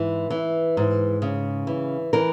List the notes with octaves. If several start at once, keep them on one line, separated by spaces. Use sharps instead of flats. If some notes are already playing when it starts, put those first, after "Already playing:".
Already playing: G#2 E3 B4
E3
G#2
C#3
E3
E3 A#4